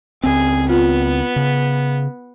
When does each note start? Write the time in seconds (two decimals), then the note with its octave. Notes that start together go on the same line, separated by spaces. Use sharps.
0.24 C#2 C4 G#4
0.69 B3 F4
1.36 C#3